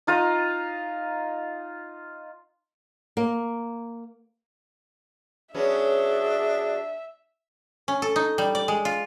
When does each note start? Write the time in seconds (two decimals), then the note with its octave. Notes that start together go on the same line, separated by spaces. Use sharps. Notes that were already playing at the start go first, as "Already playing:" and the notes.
0.07 D#4 F4 D#5 A#5
3.17 A#3
5.55 F#3 B3 C#4 D4 G#4 E5
7.88 C#4
8.02 A4
8.16 D#4
8.38 G3
8.55 D5
8.68 G#3
8.85 F4